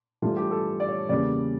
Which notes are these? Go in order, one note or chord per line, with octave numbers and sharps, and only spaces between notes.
G2 E3 A3 F4
G4
A4
D5
C#5
E2 C#3 G3 A#3 D5